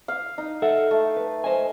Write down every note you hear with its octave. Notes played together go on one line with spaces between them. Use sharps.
F5
D#4
A4 E5 F#5
A3
B4
C5 D#5 G#5